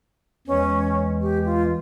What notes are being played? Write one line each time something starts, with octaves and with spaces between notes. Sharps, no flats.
E2 E3 G#3 C#4
G4
F4